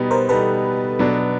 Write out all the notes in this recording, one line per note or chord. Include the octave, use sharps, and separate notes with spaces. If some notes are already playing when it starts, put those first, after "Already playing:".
Already playing: B2 G3 B3 D#4
A#4 C5
B2 G3 B3 D#4 A4 B4
B2 F#3 B3 D4